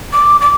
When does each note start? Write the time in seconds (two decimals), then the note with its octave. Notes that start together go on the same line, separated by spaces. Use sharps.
0.13 D6
0.41 D6